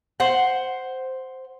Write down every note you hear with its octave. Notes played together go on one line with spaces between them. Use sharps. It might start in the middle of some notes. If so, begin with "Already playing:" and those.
C5 F#5